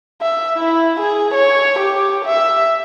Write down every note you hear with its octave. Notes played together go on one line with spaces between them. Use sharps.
E5
E4
G#4
C#5
G4
E5